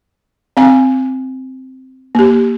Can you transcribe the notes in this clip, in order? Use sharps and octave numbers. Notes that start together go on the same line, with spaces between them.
C4 F5 G#5
A#3 G4